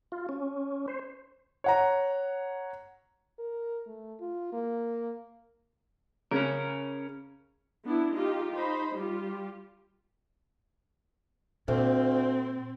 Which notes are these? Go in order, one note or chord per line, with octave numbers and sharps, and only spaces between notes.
F4
C#4
C5
C#5 F#5 A#5
A#4
A3
F4
A#3
C#3 C#4 G#4 A#4
B3 D4 E4
D#4 F4 G4
D#4 C5 B5
G3 F4 G4
D2 A#2 C4